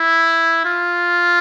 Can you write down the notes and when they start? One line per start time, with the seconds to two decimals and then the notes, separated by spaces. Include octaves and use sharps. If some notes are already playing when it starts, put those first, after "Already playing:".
Already playing: E4
0.65 F4